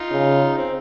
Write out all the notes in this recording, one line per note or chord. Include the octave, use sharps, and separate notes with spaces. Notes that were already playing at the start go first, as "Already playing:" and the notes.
Already playing: D#4 F4
C#3
C4